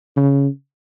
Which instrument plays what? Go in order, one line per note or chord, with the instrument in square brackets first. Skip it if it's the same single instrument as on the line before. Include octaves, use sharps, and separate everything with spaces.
[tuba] C#3